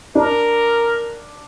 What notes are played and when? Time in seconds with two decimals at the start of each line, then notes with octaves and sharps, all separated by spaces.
0.15 D4 A#4